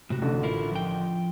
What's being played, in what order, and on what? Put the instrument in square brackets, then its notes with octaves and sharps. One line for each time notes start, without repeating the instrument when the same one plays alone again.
[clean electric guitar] A2 C3 F#4
[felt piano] A1 D3
[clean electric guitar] E4 F4 A#4
F3 G5